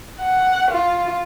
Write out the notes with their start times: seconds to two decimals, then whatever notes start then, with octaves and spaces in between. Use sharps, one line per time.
0.20 F#5
0.71 F4